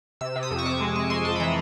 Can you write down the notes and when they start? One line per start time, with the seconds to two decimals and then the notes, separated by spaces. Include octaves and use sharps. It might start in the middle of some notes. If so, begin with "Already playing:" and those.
0.21 C3 E6
0.36 C3
0.43 D#6
0.51 F2
0.59 C#6
0.65 C3 D6
0.80 G#3
0.96 G#3 C#6
1.10 G#3 C6
1.25 F2 A5
1.35 B5
1.40 E3 A#5